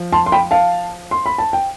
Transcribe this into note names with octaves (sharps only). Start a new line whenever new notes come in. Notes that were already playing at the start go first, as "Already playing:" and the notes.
Already playing: F3
A5 C6
C6
G5 B5
F5 A5
C6
B5
A5
G5